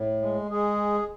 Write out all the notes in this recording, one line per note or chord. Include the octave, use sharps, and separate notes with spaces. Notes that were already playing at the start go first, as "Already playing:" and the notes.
Already playing: A2
G#3
G#3 G#4